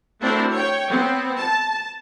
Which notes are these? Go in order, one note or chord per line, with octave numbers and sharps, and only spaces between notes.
A3 C4 D4 E4 F#4 A#4
C#5 G5
B3 C4
A5